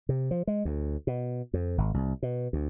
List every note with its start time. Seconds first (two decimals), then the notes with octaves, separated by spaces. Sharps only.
0.09 C3
0.31 F3
0.47 G#3
0.65 D2
1.07 B2
1.54 F2
1.78 G#1
1.94 C2
2.23 B2
2.53 D2